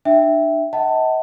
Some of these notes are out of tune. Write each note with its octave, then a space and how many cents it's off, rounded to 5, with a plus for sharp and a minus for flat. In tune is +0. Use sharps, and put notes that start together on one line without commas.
D4 +30 E5 +0 G5 +0
D#5 +40 F#5 +25 A5 +15